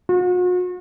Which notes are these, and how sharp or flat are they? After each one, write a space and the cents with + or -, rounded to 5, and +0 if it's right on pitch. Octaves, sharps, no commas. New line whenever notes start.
F#4 -45